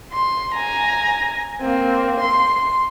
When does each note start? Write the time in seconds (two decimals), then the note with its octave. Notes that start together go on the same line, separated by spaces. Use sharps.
0.12 C6
0.55 G#5 A#5
1.61 A#3 C4
2.20 C6